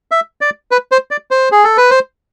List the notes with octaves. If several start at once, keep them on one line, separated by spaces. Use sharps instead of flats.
E5
D5
B4
C5
D5
C5
G#4
A4
B4
C5